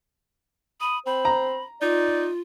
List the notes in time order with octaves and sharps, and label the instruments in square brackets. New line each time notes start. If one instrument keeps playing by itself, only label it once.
[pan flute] B5 [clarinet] D#6
[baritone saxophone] C4 [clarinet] C5 [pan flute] B5
[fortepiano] A#5
[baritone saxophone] D#4 [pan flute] F4 [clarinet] D5